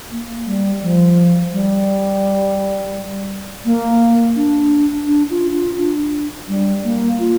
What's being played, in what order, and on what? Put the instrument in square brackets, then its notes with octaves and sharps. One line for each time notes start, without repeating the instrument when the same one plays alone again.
[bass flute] A#3
G3
F3
G3
A#3
D4
D4
F4
F4
D4
G3
A#3
F4